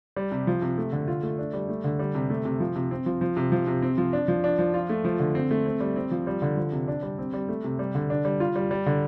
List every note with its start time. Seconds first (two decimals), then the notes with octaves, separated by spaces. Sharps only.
0.16 G3
0.32 C3
0.47 F3
0.62 C3
0.78 A3
0.93 D3
1.08 F4
1.23 A3
1.38 D4
1.53 G3
1.69 A3
1.84 D3
1.99 G3
2.15 C3
2.30 A3
2.45 C3
2.60 F3
2.76 C3
2.91 C4
3.06 F3
3.21 F3
3.37 C3
3.52 F3
3.67 C3
3.82 C4
3.98 F3
4.13 D4
4.28 F3
4.44 D4
4.59 F3
4.74 F4
4.89 A3
5.05 F3
5.20 D3
5.35 C4
5.51 A3
5.66 C4
5.80 G3
5.96 C4
6.11 F3
6.27 G3
6.42 D3
6.57 F3
6.72 C3
6.88 D4
7.03 G3
7.18 C4
7.34 G3
7.49 A3
7.64 C3
7.79 G3
7.95 D3
8.10 D4
8.25 G3
8.40 F4
8.56 G3
8.71 G3
8.86 D3